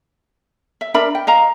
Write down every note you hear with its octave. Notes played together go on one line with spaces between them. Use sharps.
E5
D4 A#4 E5 B5
G5
D#5 F5 A#5